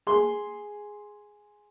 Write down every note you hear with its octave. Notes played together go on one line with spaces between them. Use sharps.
G#4 C6